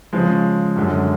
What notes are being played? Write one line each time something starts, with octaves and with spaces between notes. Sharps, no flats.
C#3 F3 G#3
F#2 D3 G#3